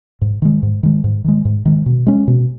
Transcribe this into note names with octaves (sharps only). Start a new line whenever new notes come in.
G#2
D#3 G#3
G#2
D#3 G#3
G#2
D#3 G#3
G#2
D#3 G#3
B2
G#3 C#4
B2